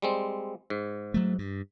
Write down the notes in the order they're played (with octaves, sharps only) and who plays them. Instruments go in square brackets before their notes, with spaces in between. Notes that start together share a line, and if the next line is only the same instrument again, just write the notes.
[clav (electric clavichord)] G3 G#3 C4
G#2
[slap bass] F#3 A3
G2